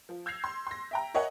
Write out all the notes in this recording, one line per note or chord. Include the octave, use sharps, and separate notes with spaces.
F3
E6 G6 G#6 A#6 C7 F7
C6
C6 A#6
E5 G5 A#5
A#4 C#5 D#5 E5 F#5 G#5